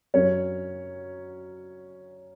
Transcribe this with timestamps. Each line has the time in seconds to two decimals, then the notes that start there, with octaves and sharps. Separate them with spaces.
0.14 F#2 F#3 C#4 C#5